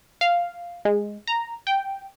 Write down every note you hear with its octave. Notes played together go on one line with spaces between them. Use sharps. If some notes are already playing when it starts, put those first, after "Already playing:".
F5
G#3
A#5
G5